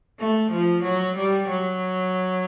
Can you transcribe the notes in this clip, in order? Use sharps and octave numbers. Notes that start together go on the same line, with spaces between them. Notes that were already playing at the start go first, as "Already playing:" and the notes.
A3
F3
F#3
G3
F#3